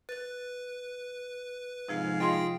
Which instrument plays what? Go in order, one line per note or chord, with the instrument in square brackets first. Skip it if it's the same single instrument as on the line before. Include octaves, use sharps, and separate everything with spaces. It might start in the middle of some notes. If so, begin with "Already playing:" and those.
[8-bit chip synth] B4 [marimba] F#6 A6
[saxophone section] F2 G#2 F5 [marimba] C3 F3
[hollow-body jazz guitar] F4 D#5 C6 [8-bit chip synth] G#4 G5